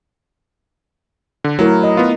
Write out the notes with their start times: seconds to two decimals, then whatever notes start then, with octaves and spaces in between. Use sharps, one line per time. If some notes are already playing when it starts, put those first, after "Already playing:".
1.44 D3
1.59 F#3 A3 E4 A#4
1.83 D#5
1.97 B3 F4